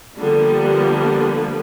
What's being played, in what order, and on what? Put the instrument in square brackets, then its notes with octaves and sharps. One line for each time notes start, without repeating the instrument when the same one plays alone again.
[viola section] D3 F3 G3 A#3 B3